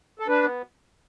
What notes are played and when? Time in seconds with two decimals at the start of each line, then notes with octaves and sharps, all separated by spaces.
0.19 A4
0.28 D4 B4
0.43 B3